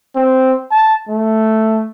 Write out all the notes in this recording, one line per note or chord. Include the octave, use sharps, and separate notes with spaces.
C4
A5
A3